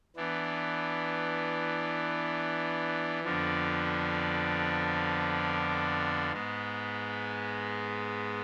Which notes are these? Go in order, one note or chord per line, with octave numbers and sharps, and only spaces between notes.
E3 B3 D4
F2 D3 F3 B3 D4
G#2 G#3 B3